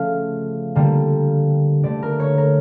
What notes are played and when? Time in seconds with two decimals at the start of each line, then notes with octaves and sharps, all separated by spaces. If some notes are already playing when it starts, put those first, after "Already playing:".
Already playing: C#3 F3 A3 F5
0.75 D3 G3 A#3
1.84 D3 A3 D5
2.03 A#4
2.20 C#5
2.38 A#4